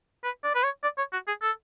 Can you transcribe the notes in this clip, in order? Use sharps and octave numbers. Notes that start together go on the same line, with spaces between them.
B4
D5
B4
C#5
D5
C#5
F#4
G#4
A4